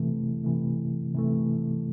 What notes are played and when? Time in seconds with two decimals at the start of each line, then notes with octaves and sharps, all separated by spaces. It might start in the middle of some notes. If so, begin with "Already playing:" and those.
Already playing: C3 E3 A3
0.44 C3 E3 A3
1.15 C3 E3 A3